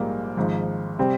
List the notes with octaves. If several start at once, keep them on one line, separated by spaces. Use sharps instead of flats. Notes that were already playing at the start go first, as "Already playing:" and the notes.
Already playing: A#1 G#2 G3 A#3
G#1 G#2 F3
C3 G3 C4